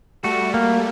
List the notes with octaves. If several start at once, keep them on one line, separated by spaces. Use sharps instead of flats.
G3 A3 F#4
A#3